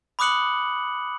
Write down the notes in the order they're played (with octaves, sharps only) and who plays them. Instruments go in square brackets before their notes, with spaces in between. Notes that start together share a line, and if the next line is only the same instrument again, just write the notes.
[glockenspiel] B5 D6 D#6 F#6 C#7 F#7